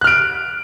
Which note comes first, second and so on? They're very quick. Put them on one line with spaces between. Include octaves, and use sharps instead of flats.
F#6 F6 D7